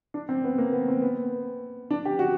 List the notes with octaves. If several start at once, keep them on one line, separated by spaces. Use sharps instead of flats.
D4
C4
B3
A#3
B3
C4
B3
D4
G4
F#4